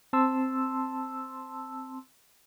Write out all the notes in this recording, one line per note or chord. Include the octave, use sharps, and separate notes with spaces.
C4 A5 C6 E6